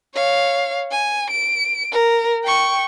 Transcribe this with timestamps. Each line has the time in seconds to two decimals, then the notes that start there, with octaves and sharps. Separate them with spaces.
0.14 C#5 F5
0.91 G#5
1.30 D7
1.92 A#4
2.44 G5 C#6